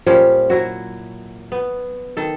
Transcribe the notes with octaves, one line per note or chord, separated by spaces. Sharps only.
A#2 F3 G3 C#4
F#3 E4 F#4
B3
D#3 A4